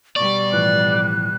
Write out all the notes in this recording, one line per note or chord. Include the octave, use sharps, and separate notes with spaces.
B2 G3 D5 C#6
A2 E3 F3 F#6